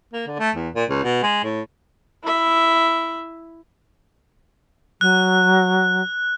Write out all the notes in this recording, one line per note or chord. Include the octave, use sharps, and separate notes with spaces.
A#3
D3
A3
E2
A#2
C#2
B2
G#3
A2
E4 E5
F#3 F#6